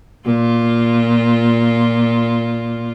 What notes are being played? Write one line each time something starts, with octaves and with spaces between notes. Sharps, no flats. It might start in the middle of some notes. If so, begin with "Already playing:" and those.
A#2 F4